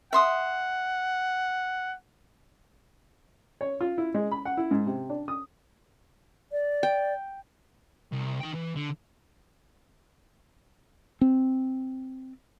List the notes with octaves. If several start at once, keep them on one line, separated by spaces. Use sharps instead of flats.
E5 F#5 C6 D#6
C#5
F4
E4
G#3
B5
F#5
E4
G#2
C3
D4
D#6
D5
G5
C2
D#4 G5
E3
D3
C4